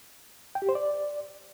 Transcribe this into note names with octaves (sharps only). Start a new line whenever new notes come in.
G5
G4
C5
D5